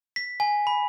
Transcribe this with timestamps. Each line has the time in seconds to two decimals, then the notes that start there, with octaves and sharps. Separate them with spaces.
0.16 B6
0.40 G#5
0.67 B5